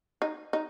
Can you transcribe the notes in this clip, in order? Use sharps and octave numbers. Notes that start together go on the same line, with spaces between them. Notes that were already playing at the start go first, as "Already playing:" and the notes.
D#4
D#4